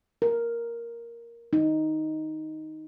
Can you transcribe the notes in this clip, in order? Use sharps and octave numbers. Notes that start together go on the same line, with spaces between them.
A#4
D#4